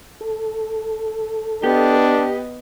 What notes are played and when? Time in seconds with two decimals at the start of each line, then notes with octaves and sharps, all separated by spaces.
0.21 A4
1.64 B3 D4 G4 D#5